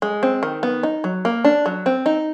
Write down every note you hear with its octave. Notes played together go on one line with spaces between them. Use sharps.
G#3
C4
D#3
B3
D#4
F#3
A#3
D4
F#3
C4
D#4